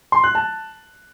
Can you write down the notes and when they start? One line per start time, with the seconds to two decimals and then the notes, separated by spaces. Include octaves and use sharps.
0.12 C6
0.24 F#6
0.35 A5